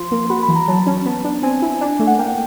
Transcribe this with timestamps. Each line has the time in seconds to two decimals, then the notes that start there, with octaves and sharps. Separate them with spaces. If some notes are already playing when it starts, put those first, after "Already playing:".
Already playing: F3 C6
0.11 A#3
0.30 F#4 B5
0.43 B5
0.48 E3
0.56 A#5
0.68 F#3 A5
0.86 C#4
1.06 B3
1.24 D4
1.43 C4 G#5
1.62 E4
1.81 D4
2.00 A3
2.07 F#5
2.18 A#3 G5